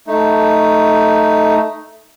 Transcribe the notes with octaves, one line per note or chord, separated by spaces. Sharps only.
A3 D#4